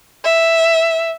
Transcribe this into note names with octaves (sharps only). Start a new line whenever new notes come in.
E5